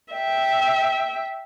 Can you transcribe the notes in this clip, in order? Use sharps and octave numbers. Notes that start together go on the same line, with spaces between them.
E5 G5